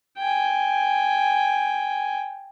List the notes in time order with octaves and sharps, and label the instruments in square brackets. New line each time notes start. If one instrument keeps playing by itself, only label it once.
[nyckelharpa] G5 G#5